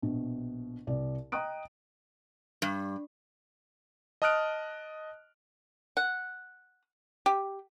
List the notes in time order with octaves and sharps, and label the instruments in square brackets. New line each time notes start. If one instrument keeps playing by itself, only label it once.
[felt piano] A#1 B2
C2 D5
D#5 G5 A#5 D#6 F#6 D7
[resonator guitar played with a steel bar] G2
[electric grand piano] D#5 A5 D#6 F6 F#6 D7
[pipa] F#5
G4